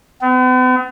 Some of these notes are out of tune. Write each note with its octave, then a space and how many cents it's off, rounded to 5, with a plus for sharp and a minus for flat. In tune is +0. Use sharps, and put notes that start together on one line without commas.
B3 +45